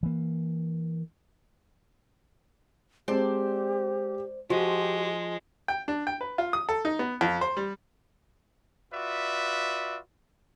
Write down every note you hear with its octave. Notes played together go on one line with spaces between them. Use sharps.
E3 A#3
G#3 C4 G4 C5 D5 A5
F3 G#3 F#4 G4
G5
D4
G5
B4
F4
D#6
A4
D#4
B3
F2
C5
G3
F4 F#4 B4 D5 E5